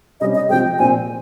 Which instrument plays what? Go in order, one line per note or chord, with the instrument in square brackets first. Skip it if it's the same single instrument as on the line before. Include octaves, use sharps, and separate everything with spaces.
[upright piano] C3 G3 C#4 [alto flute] D#5
[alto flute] D#5
[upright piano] C3 F3 G#3 C4 [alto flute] G5
[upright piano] A#2 F3 C4 [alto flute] G#5